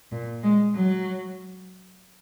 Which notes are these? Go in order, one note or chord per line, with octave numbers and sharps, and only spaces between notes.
A#2
G#3
F#3